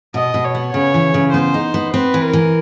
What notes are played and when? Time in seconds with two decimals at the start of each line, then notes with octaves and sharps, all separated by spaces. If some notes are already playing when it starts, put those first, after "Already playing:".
0.14 B2 D#5
0.34 B2
0.45 C#5
0.55 B3
0.73 C#3 C#5
0.94 E3
1.14 C#3
1.34 B3 C5
1.54 D#4
1.74 B3
1.94 C4 B4
2.14 E3
2.23 A#4
2.33 E3